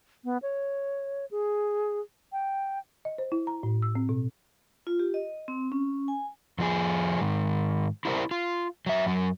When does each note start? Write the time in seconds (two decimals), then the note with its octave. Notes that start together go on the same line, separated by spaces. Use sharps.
0.24 B3
0.42 C#5
1.31 G#4
2.33 G5
3.05 D#5
3.18 C5
3.32 E4
3.47 A#5
3.63 A2
3.82 E6
3.95 C4
4.09 B2
4.87 F4
4.99 G4
5.14 D#5
5.48 C4
5.72 C#4
6.08 G#5
6.58 F2 F3 E4 G#4
7.21 G#2 D#3
8.05 E4 G4 A#4 C5 D5
8.31 F4
8.86 F#3 E5
9.06 F#2 F#3